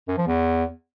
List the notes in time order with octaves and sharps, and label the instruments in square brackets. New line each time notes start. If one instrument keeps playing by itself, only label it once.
[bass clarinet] F#2
F3
E2